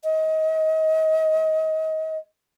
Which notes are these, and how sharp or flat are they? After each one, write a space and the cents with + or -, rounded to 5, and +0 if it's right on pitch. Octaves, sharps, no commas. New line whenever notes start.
D#5 +30